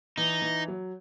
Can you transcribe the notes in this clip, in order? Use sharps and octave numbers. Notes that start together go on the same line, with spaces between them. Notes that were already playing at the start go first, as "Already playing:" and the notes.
E3 D#4
E3
F#3